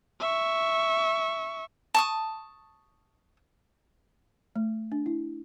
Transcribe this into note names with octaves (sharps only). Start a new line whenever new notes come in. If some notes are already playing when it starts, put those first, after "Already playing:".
E5 C#6
A5 C#6 D#6
A3
D4
E4